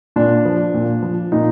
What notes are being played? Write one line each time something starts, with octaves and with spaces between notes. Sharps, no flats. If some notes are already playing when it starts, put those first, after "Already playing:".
A#2 D4
F3
A#2
F3
A#2 D#4